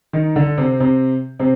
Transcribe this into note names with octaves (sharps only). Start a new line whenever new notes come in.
D#3 D#4
D3 D4
C3 C4
C3 C4
C3 C4